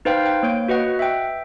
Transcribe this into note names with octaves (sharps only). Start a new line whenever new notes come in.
D#4 B4 C5 F5 G5
G5
A#3 C#5 D7
F#4 B4 D#5 F#5
E5 G5